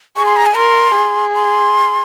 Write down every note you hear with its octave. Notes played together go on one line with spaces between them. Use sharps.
G#4 C#6
C6
A#5
G#5
A#4 C6
G#4
C6